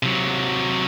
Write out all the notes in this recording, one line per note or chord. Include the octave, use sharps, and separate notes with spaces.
C3 F#3